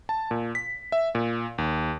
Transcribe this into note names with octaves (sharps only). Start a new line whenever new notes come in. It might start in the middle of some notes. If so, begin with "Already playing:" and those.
A5
A#2
B6
E5
A#2
D#2